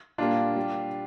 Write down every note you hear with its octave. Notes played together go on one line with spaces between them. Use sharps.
A#2 G3 A#3 D4 F4
G3